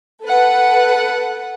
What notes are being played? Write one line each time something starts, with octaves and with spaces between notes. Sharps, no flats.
A4 B4 F#5